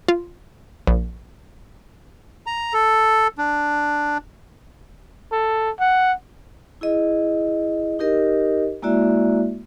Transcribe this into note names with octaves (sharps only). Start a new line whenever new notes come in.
F4
A#1
A#5
A4
D4
A4
F#5
E4 G#4 D#5
D#4 G4 A#4 D#5
G#3 A#3 E4 F#4 D5 E5